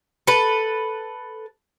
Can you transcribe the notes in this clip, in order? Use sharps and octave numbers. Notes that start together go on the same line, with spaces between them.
A4 B4